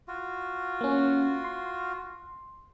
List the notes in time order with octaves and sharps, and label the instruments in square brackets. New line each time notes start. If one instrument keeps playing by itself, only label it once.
[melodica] F4 F#4
[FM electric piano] A#3 C#4
C6